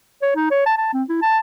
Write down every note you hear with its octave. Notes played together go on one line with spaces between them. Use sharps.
C#5
D#4
C#5
A5
A5
C4
E4
A5